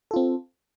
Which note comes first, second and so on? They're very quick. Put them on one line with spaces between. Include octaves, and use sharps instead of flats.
A4 F4 C4